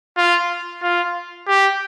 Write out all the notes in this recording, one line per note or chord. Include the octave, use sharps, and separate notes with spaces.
F4
F4
G4